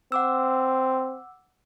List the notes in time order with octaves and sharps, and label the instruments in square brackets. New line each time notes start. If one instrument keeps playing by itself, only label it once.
[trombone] C4 [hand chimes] F#5 D6 E6